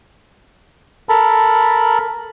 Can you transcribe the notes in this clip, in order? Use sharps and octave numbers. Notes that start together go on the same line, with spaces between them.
A4 A#4 A5 B5